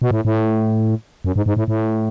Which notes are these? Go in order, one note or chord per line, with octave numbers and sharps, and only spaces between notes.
B2
A2
A2
F#2
G#2
G#2
A2
A2